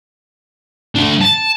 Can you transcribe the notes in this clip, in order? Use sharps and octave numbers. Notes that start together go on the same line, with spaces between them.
A3 D4
A5